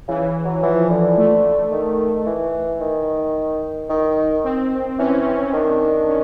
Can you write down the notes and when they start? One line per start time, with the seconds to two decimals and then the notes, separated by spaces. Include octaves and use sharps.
0.08 C#3 E3
0.45 F#3
0.63 E3 F3
0.90 D3
1.17 A3
1.72 D#3
2.26 E3
2.81 D#3
3.90 D#3
4.44 C4
4.98 E3 C#4
5.53 D#3 D4
6.08 C#4